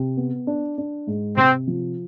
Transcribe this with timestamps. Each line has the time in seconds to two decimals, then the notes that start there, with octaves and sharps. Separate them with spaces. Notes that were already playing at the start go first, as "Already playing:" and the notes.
Already playing: C3
0.17 B3
0.47 D4
0.78 D4
1.07 G#2
1.37 C3 C4
1.67 F3